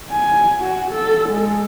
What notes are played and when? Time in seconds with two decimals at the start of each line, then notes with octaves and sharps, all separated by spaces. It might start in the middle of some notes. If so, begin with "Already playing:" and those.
0.10 G#5
0.61 F#4
0.92 A4
1.29 G#3 A4